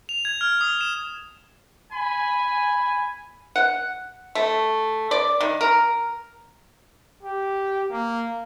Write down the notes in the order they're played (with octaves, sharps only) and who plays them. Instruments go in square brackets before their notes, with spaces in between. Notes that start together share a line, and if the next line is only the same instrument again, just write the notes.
[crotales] F7
G#6
F6
D#6
E7
[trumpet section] G#5 B5
[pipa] F#5
A3
D5
D#3
A#4
[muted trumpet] G4
A#3